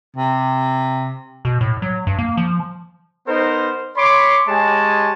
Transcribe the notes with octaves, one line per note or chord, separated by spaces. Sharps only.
C3
B2
A2
F#3
G2
A#3
F3
B3 D#4 A#4 C5
C#5 B5 C6 D6
G#3 G4 C#5 G#5 A5